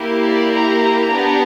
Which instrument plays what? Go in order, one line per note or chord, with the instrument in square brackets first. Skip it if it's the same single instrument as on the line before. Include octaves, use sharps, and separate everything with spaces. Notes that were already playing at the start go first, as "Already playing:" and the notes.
Already playing: [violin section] A#3 E4 G4
D5
A#5
A#5
B3 D4 G4